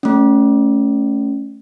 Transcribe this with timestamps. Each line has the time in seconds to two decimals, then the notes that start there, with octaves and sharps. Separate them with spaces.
0.03 A3 C#4